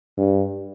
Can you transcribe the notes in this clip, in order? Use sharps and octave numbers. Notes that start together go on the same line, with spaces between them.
G2